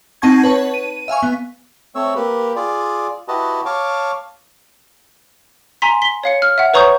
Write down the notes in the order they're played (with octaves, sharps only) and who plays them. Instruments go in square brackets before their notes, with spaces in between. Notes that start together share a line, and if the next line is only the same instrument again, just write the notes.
[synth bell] C4 D#4 F#5 A5 C#6 G#6
B4 C#5 A5
D#7
E5 F5 G#5 C#6
B3
[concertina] A3 C4 C#5 E6
A#3 G4 B4
F4 G#4 D5
E4 F#4 G4 B4 D#5 A5
C#5 F5 A5 D6
[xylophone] G#5 A#5 C6 B6
B6 G7
C#5 F5 C#7
F6
E5 F#5
B4 C#5 A#5 C#6 D#6 G6